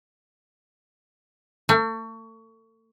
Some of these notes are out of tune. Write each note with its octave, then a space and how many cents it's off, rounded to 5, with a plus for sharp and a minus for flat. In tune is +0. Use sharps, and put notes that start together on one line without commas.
A3 +35